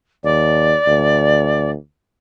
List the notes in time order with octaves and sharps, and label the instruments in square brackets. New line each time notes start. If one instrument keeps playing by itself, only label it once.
[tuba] D#2 [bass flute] D5
[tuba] D2